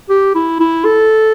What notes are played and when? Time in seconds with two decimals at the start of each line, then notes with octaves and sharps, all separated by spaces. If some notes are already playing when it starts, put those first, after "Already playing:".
0.10 G4
0.35 E4
0.60 E4
0.85 A4